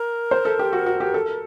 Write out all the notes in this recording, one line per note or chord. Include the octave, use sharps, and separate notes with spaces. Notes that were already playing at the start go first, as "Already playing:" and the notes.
Already playing: A#4
C5
A4
G4
F#4
F#4
G4
A4